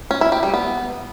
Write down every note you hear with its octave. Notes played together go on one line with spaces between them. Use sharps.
C#4
E4
G4
G3
B3